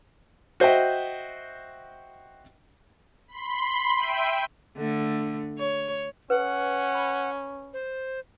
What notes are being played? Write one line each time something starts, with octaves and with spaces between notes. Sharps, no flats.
F#4 C5 D#5 E5 G5
B5 C6
E5 G5 D7 D#7
D3 A3
C#5
C#4 A4 B4 F#5
B5
C5